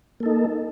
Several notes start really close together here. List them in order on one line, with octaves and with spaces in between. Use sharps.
A#3 A4 D#4